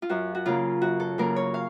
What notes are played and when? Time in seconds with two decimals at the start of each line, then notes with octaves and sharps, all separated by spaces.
0.02 F4
0.10 F#2 F#4
0.35 F#4
0.46 C#3 F#3 A#3 F4
0.82 F#2 F#4
1.00 A4
1.18 C#3 F#3 A#3 A#4
1.36 C#5
1.54 F5